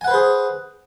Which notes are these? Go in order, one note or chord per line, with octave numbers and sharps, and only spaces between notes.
G#4 B4 C5 F#5 G#5